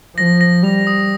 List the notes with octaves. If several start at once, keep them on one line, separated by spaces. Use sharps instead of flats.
F3 A#6
A#6
G3 F7
D#6